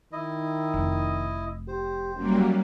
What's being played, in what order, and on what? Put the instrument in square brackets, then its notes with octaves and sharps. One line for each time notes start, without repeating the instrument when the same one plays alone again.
[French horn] D#3 [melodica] E4 D#5
[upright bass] F1
[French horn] G4 [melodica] C5
[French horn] F#2 [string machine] F#3 G3 A#3